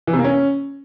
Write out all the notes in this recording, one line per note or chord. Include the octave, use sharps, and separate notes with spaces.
E3
C3
A#3
C#4